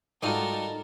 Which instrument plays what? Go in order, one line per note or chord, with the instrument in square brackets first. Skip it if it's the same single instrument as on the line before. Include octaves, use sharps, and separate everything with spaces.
[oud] G#2 D#4 D#5 [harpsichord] G3 F4 F#4 [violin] A4 A#4